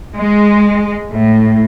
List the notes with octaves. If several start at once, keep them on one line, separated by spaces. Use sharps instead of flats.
G#3
A2